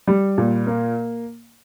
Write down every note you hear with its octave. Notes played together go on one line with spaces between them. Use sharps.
G3
A#2
A#3